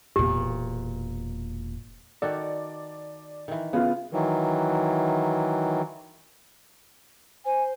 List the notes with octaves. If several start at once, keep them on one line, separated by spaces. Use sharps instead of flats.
E1 A#2 G4
D#3 F#4 A4 D5
D#3 E3
C#3 B3 F4
D#3 E3 F#3
C5 G#5